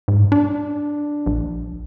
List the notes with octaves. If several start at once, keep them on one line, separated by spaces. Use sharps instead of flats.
G#2
D4
A#1